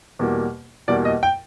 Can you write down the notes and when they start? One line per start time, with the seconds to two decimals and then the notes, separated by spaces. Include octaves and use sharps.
0.19 E2 B2 G3 A#3
0.88 E2 B2 G3 A#3 D5
1.05 D#5
1.23 G5